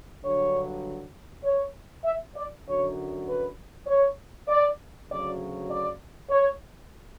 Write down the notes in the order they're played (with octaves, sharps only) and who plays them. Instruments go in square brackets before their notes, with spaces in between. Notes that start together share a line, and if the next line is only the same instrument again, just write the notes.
[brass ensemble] G2 D3 F#3 C#5
C#5
E5
D5
F#2 D3 F#3 C#5
B4
C#5
D5
D2 C#3 F#3 D5
D5
C#5